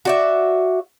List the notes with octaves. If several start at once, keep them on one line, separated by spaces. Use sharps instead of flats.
F#4 D5 E5